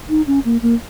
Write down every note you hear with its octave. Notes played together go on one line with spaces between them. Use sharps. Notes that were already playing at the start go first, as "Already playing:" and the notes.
D#4
C#4
A#3
A#3